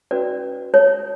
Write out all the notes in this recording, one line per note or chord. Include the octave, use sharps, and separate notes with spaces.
C#4 F#4 B4 D5
C#5